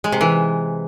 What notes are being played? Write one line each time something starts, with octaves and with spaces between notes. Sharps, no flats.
G#3
C3
E3